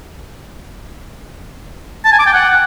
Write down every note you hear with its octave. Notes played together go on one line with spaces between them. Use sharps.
A5
G#5
D6
G5
F#5